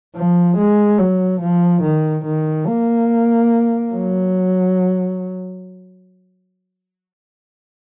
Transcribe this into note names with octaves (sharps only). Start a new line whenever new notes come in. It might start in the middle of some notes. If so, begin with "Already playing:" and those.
F3
G#3
F#3
F3
D#3
D#3
A#3
F#3